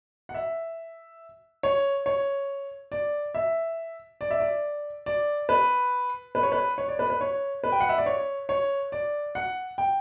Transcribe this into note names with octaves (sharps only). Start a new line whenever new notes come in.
F#5
E5
C#5
C#5
D5
E5
D5
E5
D5
D5
B4
B4
C#5
B4
C#5
D5
B4
B4
C#5
B4
G5
F#5
E5
D5
C#5
C#5
D5
F#5
G5